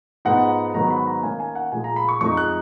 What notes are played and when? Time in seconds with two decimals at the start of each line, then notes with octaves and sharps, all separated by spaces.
0.25 G#2 F3 G#3 B3 D#4 F#5
0.74 G#2 D#3 F#3 B3 D#4 A#5
0.91 B5
1.07 A#5
1.23 D#3 A#3 C#4 G#5
1.40 G#5
1.55 F#5
1.72 A#2 F3 G#3 G#5
1.84 A#5
1.96 B5
2.09 C#6
2.21 F2 F3 G#3 D#4 C#6
2.37 F#6